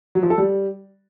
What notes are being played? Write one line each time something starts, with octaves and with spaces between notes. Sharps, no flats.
F#3
F3
A4
G3